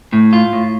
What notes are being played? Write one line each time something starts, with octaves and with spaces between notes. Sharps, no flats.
A2
F4
A2